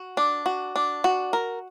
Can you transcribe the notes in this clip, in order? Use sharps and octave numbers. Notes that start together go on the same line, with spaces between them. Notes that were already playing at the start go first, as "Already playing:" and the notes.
Already playing: F#4
D4
F#4
D4
F#4
A#4